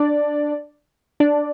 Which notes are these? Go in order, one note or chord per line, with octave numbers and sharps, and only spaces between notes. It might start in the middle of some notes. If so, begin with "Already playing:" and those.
Already playing: D4 D5
D4 D5